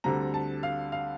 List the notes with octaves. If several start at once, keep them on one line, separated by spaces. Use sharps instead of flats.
D2 D3 G3 C4 A#5
A5
F5
F5